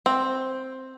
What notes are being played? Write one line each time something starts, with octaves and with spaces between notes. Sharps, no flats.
C4